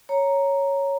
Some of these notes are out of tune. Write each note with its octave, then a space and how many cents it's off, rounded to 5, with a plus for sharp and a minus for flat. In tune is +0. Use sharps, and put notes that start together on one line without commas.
C#5 +0 A#5 +0